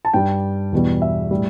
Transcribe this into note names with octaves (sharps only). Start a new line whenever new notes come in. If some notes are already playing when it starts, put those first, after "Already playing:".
A5
G2 G3 G5
E2 B2 G3
E5
A2 G3